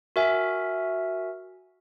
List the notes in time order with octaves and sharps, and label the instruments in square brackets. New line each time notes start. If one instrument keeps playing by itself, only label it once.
[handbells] F#4 A#4 E5 G#5